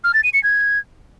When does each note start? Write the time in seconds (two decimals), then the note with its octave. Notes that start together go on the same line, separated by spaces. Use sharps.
0.04 F6
0.14 A6
0.24 D#7
0.34 C#7
0.43 G#6